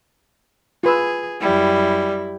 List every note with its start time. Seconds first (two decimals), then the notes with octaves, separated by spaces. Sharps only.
0.83 F4 G#4 B4 E6
1.41 F#2 G3 E4